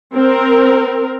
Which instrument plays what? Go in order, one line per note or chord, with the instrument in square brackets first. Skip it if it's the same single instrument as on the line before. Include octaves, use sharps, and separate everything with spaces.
[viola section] C4 A#4